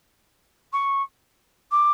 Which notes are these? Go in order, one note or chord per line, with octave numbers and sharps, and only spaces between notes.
C#6
D6